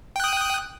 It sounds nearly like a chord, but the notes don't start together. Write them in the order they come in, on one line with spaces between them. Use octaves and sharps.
G5 F#6 D#6